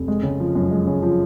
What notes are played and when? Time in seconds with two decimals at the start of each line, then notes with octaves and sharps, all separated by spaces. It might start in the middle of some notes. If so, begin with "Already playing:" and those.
Already playing: F1
0.08 G#3
0.23 C#3
0.40 F3
0.55 F#2
0.71 G#3
0.87 C#3
1.02 F3